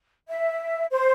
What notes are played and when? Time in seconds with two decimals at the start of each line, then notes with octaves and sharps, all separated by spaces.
0.28 E5
0.91 C5